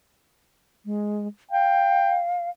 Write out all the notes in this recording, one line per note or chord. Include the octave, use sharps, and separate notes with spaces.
G#3
F5 G5